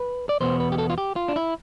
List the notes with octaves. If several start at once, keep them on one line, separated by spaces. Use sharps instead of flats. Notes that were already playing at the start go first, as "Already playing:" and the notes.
Already playing: B4
D5
E2 B2 B3 C5
B4
G4
A4
F4
G4
F4
D4
E4